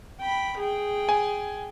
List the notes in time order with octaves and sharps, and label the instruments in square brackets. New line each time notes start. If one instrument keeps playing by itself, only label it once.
[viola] G5 B5
G#4 G5
[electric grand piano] G#5